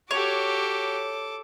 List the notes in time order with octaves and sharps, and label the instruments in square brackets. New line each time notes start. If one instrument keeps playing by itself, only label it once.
[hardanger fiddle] F#4 G4 [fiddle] A4 D6 [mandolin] C#5